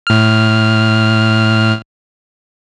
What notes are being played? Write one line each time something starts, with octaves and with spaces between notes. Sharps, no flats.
A2 F6